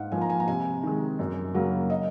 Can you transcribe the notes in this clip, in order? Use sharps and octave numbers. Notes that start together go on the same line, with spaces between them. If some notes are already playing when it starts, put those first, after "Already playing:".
Already playing: G#2 F5 F#5
F3 A#3 G#5
A#5
G#5
A#5
C3 G#5
D#3 G#3
F#2
C#3 F#3 A#3
D#5